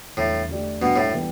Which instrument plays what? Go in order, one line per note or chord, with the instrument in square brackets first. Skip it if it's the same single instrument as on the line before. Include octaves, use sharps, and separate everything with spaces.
[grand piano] E2 D3 G3 [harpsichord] A2
[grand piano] D3 A3 G4 D5
[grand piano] G2 G3 D4 [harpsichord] B2
[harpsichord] A2
[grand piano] E3 G3 B3